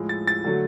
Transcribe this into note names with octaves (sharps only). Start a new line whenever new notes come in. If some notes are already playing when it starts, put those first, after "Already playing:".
Already playing: A2 F3 G#3
A6
A6
D3 F#3 A3